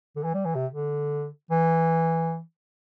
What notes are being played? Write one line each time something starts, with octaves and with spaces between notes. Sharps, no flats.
D3
E3
G3
E3
C3
D3
E3